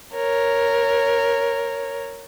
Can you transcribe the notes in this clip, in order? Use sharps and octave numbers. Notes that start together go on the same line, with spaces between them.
A#4 C#5